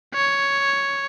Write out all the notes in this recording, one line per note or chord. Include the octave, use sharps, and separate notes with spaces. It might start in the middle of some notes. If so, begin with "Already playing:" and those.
C#5